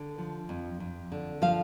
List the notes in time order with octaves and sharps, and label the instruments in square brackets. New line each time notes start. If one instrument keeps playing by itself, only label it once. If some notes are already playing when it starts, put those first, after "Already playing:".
Already playing: [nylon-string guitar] D3
F3
F2
F2
D3
F3 F5